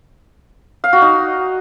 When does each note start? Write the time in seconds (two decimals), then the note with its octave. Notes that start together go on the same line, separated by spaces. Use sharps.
0.84 F5
0.93 F#4
1.02 D#4